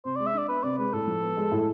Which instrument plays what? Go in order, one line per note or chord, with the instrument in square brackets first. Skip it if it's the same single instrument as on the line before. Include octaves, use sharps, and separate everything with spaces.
[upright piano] C3 [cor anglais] C5
[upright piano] G#3 [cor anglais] D5
[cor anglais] E5
[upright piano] D4 [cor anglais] D5
[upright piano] B3 [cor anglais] B4
[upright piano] C3 [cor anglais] D5
[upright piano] G#3 [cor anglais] B4
[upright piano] A2 [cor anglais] A4
[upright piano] F3
B3
G#3
A2